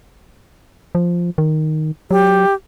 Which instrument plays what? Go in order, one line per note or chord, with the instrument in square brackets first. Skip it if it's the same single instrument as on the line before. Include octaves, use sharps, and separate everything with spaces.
[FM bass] F3
D#3
[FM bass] F#3 [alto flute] G4